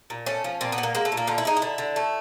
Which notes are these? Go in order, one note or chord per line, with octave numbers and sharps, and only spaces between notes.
A#2
A3 C#4
F3
A#2 C4
B3
A#2
A#3
G#3 A#3
A3
A#2
A#3
D3 F4
E4
G#3 D#4
E4
D3
D3
A3